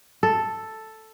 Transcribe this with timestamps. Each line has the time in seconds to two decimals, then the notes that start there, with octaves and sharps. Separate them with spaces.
0.23 A4